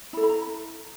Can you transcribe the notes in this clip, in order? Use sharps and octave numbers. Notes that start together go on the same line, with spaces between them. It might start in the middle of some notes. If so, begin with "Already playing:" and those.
E4 A4 B5
B5
A#5